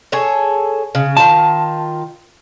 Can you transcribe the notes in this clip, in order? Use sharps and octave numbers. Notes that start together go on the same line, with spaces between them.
G#4 A4 C#5
C#3
D#3 F4 A5